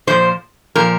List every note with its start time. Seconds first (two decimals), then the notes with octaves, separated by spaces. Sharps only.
0.07 A#2 F3 C5
0.75 A#2 F3 A#4